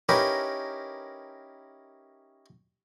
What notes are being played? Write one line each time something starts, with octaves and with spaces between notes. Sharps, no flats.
C#4 D#4 E4 G4 A#4 B4